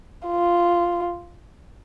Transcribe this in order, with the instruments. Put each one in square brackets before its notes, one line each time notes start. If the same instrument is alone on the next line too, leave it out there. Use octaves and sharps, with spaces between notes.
[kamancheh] F4